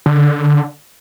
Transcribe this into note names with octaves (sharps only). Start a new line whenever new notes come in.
D3